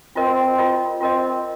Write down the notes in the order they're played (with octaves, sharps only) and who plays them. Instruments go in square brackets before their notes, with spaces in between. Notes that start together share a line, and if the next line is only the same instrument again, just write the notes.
[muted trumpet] C4 [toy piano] F4 A#4 D#5
[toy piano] F4 A#4 D#5
[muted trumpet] C4 [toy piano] F4 A#4 D#5